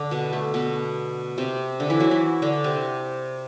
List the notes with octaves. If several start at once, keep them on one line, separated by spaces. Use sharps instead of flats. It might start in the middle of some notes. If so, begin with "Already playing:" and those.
Already playing: D3 D4
B2 B3
A3
B2 B3
C3 C4
D3 D4
E3 E4
F#3 F#4
E3 E4
D3 D4
C3 C4